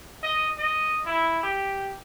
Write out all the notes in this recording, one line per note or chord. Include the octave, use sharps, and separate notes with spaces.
D#5
D#5
E4
G4